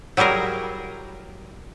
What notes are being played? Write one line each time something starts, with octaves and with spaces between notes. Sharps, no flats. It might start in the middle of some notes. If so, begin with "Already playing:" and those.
F#3 G3 E4 G#4 A#4